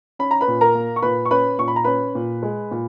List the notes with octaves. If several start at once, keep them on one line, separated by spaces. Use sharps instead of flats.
C#4 B5
A#5
B4 B5
A#2
A#4 A#5
A#3
C#6
A#2 B4 B5
C#6
C#4 B4 B5
A#2 C#6
B5
A#5
C#4 B4 B5
A#2
G#3
A#2